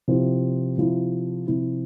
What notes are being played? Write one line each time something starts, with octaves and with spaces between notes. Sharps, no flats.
C3 F3 C4 E4
C3 F3 C4 E4
C3 F3 C4 E4